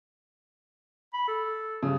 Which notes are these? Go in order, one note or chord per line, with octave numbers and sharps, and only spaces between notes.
B5
A4
G2 C#3